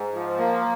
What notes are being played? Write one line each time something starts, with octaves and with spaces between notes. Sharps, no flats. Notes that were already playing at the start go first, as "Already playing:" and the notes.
Already playing: G#2
F3
A#3